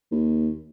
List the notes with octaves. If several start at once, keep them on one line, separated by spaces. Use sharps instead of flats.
D#2